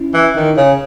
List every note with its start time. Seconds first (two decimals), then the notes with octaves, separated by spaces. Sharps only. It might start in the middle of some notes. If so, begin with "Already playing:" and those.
Already playing: C#4 E4
0.14 E3
0.36 D#3
0.57 C#3